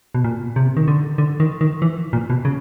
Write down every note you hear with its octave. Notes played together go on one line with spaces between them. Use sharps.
B2
A#2
C3
D#3
D3
D3
D#3
D#3
E3
A#2
B2
C#3